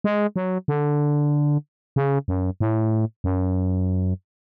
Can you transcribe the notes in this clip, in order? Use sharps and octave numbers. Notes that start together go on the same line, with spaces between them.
G#3
F#3
D3
C#3
F#2
A2
F#2